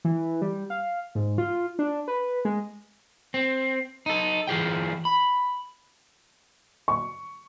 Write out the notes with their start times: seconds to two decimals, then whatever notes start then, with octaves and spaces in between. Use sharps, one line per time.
0.05 E3
0.42 G3
0.70 F5
1.15 G#2
1.38 F4
1.79 D4
2.08 B4
2.45 G#3
3.34 C4
4.06 D#4 A4
4.47 E3 F4 G#4 G5
5.05 B5
6.88 C#6